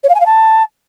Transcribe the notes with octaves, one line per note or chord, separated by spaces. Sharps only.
C#5
F5
G#5
F5
A5